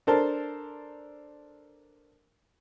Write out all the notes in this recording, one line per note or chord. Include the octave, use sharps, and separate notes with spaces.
D4 A4 A#4 C5 A5